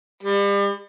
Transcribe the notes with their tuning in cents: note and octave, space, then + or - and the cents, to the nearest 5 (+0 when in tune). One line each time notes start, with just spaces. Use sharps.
G3 +35